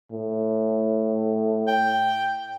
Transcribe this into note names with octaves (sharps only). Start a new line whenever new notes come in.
A2
G5